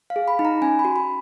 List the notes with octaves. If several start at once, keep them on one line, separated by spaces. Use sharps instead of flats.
F5
G#4
B5
D#4
A#5
C#4 G#5
B5
F#4
B5